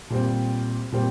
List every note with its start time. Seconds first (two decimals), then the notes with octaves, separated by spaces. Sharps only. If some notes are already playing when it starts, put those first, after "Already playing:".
0.10 A#2 G3 C4
0.92 A#2 G3 C4